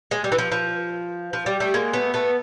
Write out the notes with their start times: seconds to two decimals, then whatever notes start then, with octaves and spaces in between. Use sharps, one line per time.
0.11 G#3
0.24 G3
0.32 E3
0.38 F3
0.52 F3
1.33 F3
1.46 G3
1.60 G3 A3
1.74 G#3 A#3
1.93 A3 B3
2.14 A3 B3